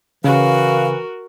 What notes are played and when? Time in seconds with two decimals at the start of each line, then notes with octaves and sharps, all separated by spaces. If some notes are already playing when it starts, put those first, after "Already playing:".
0.24 C#3 E3 F#4 A#4 F5